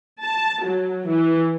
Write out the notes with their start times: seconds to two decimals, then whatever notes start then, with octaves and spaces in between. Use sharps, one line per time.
0.21 A5
0.64 F#3
1.07 E3